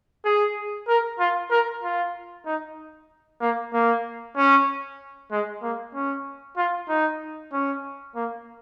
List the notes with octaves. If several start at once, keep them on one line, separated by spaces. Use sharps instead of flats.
G#4
A#4
F4
A#4
F4
D#4
A#3
A#3
C#4
G#3
A#3
C#4
F4
D#4
C#4
A#3